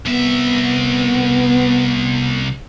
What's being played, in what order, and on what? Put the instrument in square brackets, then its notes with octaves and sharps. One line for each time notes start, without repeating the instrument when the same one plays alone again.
[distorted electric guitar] C2 E5 [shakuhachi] B3